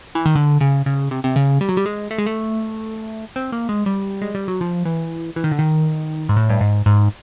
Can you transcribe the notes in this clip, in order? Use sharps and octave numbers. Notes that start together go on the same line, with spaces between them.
E3
D#3
D3
C#3
C#3
C3
C3
C#3
G3
F#3
G3
G#3
A3
G#3
A3
C4
A#3
G#3
G3
G#3
G3
F#3
F3
E3
E3
D#3
D3
D#3
G#2
A2
G2
G#2
G#2